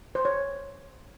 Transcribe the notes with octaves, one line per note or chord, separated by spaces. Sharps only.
C5
C#5